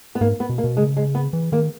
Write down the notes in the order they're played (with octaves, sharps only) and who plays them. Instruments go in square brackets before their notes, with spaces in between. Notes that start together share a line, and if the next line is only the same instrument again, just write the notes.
[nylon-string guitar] B3
[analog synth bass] G#2 [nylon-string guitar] A#3
[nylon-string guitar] B3
[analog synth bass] B2
[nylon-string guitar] A#3
[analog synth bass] B2
[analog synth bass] C#3 [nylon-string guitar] G#3
[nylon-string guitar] G#3
B3
[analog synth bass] E3
[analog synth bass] D#3 [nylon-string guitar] A#3